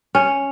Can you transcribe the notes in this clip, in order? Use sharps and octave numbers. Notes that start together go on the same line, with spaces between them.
C#4